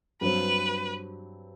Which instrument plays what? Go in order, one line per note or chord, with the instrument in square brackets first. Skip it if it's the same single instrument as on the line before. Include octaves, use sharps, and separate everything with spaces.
[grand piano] G2 F#3 C4 [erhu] B4